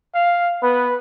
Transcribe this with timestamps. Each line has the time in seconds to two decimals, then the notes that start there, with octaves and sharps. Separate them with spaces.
0.15 F5
0.63 B3 B4